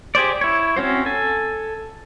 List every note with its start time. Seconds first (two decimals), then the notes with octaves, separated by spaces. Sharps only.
0.15 G4 G#4 C5 D5
0.41 E4 C#5
0.76 C4 C#4 F#4 C5
1.06 A4 G#5